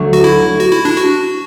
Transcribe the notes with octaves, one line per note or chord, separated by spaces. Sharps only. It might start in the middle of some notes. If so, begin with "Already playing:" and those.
Already playing: D2 D3 F#3 A3
F#4
E4
F#4
E4
D4
F#4